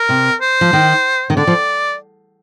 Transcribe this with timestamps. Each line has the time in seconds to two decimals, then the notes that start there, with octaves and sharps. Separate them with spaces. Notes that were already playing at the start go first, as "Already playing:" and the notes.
Already playing: A#4
0.09 C3
0.41 C5
0.61 F3
0.73 D#3
1.30 D#3
1.37 D3 D5
1.47 F3